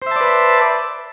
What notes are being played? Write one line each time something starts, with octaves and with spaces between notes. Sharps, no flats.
B4 C5 D5 E5 A5